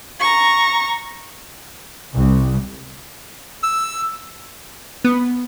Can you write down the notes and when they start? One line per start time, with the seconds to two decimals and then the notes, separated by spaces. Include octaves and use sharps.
0.20 A#5 C#6
2.14 C2
3.63 E6
5.05 B3